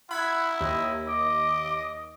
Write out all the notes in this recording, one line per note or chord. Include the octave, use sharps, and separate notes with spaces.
E4 F#5 B5 G#6
D#2 D#5
D#5 D6